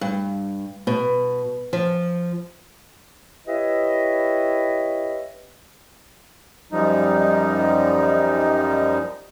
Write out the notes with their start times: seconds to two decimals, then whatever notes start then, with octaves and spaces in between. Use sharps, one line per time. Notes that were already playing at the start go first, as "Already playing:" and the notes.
0.01 G2
0.87 B2
1.73 F3
3.47 E4 G4 B4 C#5 D#5 E5
6.72 F#2 F3 G3 D#4